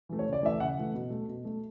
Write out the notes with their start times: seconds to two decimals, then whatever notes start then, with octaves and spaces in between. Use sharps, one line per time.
0.09 E3 A3
0.19 C#5
0.26 C#3
0.33 D5
0.43 E3 A3 E5
0.60 C#3 F#5
0.78 E3 A3
0.94 B2
1.10 A3
1.28 B2
1.45 A3